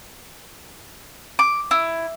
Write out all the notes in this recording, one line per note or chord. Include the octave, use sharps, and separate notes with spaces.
D6
E4